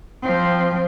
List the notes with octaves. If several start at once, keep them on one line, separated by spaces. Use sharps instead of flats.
F3 C4